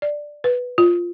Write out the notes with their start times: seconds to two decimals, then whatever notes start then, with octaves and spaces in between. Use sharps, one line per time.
0.02 D5
0.44 B4
0.78 F4